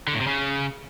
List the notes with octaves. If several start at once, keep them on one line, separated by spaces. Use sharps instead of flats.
D3
A2
C3
C#3